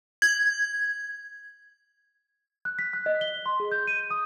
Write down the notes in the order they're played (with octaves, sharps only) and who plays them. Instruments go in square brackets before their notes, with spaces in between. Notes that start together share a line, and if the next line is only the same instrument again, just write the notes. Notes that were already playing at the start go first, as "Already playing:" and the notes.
[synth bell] G#6
[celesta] F#6
B6
F#6
D#5
G7
C6
G#4
G6
D#7
D#6